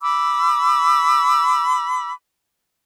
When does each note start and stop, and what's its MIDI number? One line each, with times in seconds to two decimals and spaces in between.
0.01 2.12 83
0.01 2.12 86
0.01 2.12 88